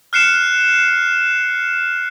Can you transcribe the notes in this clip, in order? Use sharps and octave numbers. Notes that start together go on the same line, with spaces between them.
F6 F#6 C7 C#7 E7